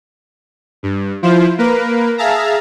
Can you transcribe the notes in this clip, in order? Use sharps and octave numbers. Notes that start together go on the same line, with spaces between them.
G2
F3 E4 F4 C5
A#3 A#4 B4
G#4 E5 F5 A5 A#5